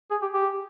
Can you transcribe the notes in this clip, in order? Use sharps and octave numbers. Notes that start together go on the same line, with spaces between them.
G#4
G4
G4